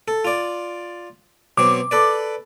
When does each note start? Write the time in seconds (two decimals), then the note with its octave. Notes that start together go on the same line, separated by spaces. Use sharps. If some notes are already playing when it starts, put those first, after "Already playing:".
0.08 A4
0.25 F4 D5
1.58 B2 F#3 C4 D6
1.91 A4 B4 D5